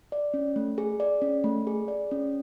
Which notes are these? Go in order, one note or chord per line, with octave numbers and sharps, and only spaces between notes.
D5
C#4
A3
G#4
D5
C#4
A3
G#4
D5
C#4